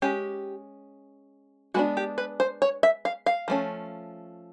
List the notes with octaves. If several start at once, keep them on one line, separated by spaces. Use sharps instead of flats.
G#3 C#4 G4
G#3 B3 D4 F#4
G4
B4
C5
C#5
E5
F5
F5
F3 A3 C#4